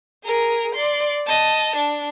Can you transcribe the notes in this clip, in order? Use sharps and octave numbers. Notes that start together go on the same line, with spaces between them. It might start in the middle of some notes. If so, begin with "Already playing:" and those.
G#4 A#4
D5 C6
D#5 A5
D4